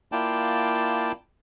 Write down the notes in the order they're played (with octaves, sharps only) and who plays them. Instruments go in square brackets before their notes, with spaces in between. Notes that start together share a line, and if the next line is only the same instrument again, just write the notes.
[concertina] A#3 E4 F4 D5 G5 A5